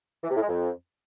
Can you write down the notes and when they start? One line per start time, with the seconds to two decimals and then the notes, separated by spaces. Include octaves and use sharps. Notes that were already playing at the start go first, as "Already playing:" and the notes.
0.24 E3
0.30 C3
0.36 A2
0.42 G#3
0.48 F2